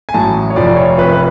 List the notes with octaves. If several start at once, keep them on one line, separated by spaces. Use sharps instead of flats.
G#5
A1 A2 F#3 A5
C#5
F1 F2 F3 D5
C#5
F1 F2 F3 B4
B4